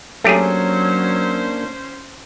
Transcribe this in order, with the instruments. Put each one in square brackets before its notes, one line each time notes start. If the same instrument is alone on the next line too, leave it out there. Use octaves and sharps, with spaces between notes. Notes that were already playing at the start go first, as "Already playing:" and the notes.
[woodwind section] F#3 [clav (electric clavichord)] A3 G4 G#4 [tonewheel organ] A#3 D4 [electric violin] C#4 C5